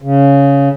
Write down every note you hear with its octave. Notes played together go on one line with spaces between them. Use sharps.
C#3